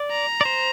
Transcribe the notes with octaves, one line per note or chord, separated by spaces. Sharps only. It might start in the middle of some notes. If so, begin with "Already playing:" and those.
Already playing: D5
A#5
D5
C5